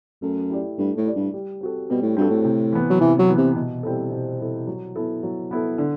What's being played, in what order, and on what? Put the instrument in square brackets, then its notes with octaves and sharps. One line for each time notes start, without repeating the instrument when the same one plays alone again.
[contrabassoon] F#2 [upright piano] A3
[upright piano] E4 G4 D5
[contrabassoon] G2 [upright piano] A3
[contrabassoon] A2
[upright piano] E4 G4 D5
[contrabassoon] G2
[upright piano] G3
C4 F#4 A4
[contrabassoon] B2 [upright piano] G3
[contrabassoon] A2
[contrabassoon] G2 [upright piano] C4 F#4 A4
[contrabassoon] A2
[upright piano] C3
E3 B3
[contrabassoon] F#3
[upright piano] C3 [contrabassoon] E3
[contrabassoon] F#3
[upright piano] E3 B3
[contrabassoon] C3
[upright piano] B2
G3 C4 E4 A4
B2
G3 C4 E4 A4
F#3
B3 E4 A4
F#3
B3 E4 A4
D3